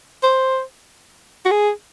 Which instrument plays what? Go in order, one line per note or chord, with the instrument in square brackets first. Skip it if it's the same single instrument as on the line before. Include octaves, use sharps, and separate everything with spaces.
[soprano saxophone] C5
F#4
G#4